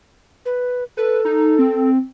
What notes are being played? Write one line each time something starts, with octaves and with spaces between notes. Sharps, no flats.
B4
A4 B4
D#4
C4